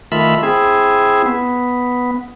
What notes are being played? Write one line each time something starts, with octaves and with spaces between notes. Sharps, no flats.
D#3 A3 F4 E5 B5
C4 E4 G#4
B3